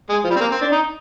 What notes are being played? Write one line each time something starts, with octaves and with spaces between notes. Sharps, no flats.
G#3
F3
G3
C4
A#3
C4
D4
D#4